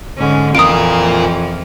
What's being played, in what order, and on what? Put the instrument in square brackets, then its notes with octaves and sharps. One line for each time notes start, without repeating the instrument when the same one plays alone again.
[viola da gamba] G#2 C#4 [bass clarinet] D3
[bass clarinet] F2 [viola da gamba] E3 F3 [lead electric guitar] F4 A#4 [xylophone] D#6 D7